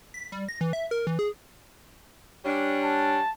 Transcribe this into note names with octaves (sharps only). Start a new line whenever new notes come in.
B6
G3
A#6
E3
E5
A#4
E3
G#4
G3 C#4 D4
A5